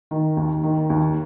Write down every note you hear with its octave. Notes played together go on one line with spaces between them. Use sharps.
D#3
D#2
D#3
D#2